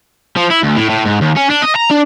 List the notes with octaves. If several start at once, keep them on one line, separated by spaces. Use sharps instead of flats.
F3
E4
D2
A2
A2
G#2
D#2
C#4
D4
D#5
A#5
D4